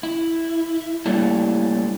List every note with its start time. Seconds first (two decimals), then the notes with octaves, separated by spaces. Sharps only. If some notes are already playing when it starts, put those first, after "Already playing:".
0.03 E4
1.06 G3 A3 A#3 C#4 D4 E4